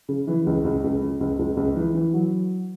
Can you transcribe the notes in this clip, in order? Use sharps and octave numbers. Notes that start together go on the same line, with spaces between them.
C#3
E3
C#2
C#2
C#2
C#3
C#2
C#2
C#2
E3
E3
F#3